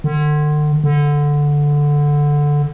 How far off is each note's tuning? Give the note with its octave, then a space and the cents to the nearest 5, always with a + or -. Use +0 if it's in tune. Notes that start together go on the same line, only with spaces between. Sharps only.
D3 +35
D3 -5